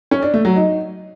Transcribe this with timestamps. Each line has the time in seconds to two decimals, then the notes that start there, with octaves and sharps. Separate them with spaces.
0.11 C#4
0.23 D4
0.34 A3
0.45 F#3
0.56 D#4